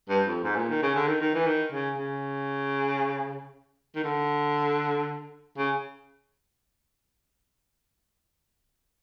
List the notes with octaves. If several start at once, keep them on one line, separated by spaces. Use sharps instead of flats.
G2
F2
G#2
A#2
D#3
C#3
D3
D#3
D#3
E3
D#3
C#3
C#3
D#3
D3
C#3